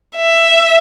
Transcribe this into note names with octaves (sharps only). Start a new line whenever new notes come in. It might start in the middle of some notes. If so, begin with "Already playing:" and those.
E5